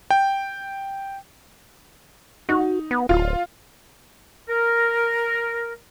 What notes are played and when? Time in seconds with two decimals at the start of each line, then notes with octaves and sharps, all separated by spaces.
0.11 G5
2.49 D#4 F#4
2.91 B3
3.09 D1 F4
4.48 A#4